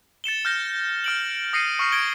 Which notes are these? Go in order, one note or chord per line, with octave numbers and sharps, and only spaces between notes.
A6 C#7 E7 G7
F6 G6 A#6 G7
F6 D7 F#7
D#6 A#6 C7 C#7 D#7
C#6 F6 C7
G#6 D7 G7